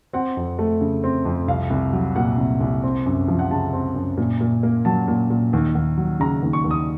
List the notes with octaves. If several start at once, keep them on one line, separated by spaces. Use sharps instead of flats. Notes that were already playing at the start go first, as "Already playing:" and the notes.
C4 F#5
F2
A3
C#3
C4
F2
C2 F5
C2
F#3
A#2 F#5
C2
C2
C4
F#2
F3
F#5
C#3 A5
C4
F#2
A#2
A#2
A#3
F#3 A5
A#2
A#2
D#2
D#2
F#3
C#3 A#5
D#2
C#6
D#2
D#6